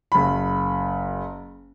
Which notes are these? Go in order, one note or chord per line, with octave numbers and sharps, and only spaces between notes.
F#1 B5